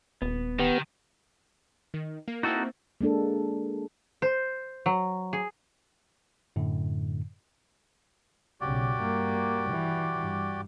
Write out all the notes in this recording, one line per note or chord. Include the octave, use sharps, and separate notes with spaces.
D#1 B3
D#3 B3 G4
D#3
A#3
A#3 C4 D#4 E4 F#4 A4
G#3 A#3 D4 A4
C5
F#3
G#4
F#2 A2 D3
B1 C#3 F#4 G4 D5
G2 A#3
E3
G2